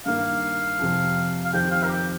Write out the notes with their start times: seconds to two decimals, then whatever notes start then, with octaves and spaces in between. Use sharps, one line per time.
0.06 G2 D#3 A#3 F5
0.79 F2 C3 F3
1.45 F5
1.53 F2 D#3 C4 G4 G5
1.71 F5
1.83 A#4
1.89 G4